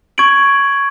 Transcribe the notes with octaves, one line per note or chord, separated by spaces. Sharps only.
C#6 G#6 D7 F#7